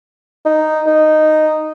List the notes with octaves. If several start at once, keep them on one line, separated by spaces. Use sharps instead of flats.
D#4
D#4